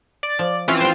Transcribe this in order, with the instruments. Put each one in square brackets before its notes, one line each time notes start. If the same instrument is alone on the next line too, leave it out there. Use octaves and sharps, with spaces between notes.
[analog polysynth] D5
[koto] F3
[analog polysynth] E3 C4 F4 [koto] C#4
[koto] C5 G5